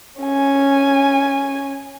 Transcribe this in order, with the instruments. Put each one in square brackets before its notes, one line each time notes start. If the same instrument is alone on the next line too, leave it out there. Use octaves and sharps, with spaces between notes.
[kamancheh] C#4 G#5